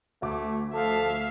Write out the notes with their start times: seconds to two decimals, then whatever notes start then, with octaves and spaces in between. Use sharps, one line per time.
0.22 D2 A3 D6
0.74 F3 A4 E5 F5